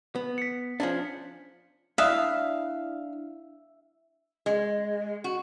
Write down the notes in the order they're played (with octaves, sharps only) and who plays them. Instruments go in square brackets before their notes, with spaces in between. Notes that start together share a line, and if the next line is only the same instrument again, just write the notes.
[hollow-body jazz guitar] B3
[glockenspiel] B6 C#7
[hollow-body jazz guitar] F3 C#4 D4
[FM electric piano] D4 E4 [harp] E5 [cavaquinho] F5 [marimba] D#6 F#6
[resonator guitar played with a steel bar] G#3
F#4